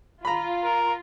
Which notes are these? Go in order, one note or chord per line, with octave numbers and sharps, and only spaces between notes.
F4 A#5 B5
A#4